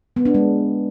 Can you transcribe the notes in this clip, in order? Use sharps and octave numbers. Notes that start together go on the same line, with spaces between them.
B3
D4
G#3